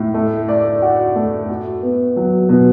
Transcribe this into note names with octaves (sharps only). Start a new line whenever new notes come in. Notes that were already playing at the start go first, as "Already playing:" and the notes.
Already playing: A2
A3
D5
F#4
A3
F#4
B3
F#3
B2